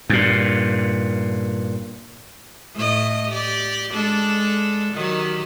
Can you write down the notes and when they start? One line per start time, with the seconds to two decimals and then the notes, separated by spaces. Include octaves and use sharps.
0.10 G2 A#2
2.74 A2 A3 D#5
3.30 G4 D5
3.93 G#3 D4 A4
4.93 D#3 F#3 G4